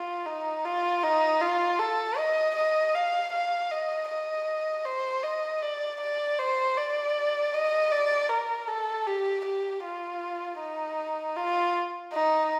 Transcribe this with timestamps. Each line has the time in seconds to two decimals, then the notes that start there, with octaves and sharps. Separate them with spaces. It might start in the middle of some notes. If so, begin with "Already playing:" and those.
Already playing: F4
0.26 D#4
0.65 F4
1.03 D#4
1.41 F4
1.79 A4
2.17 D#5
2.56 D#5
2.94 F5
3.33 F5
3.71 D#5
4.09 D#5
4.85 C5
5.23 D#5
5.62 D5
6.01 D5
6.39 C5
6.77 D5
7.54 D#5
7.92 D5
8.30 A#4
8.68 A4
9.07 G4
9.45 G4
9.84 F4
10.59 D#4
11.37 F4
12.13 D#4